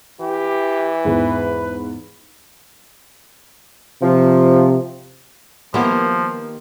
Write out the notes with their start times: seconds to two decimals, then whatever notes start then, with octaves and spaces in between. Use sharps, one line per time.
0.21 E3 G4
1.05 E2 G#2 B4
4.02 C3 F3
5.74 D#3 F3 A#3 B3 E4 G4